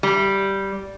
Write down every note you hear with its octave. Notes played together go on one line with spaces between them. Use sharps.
G3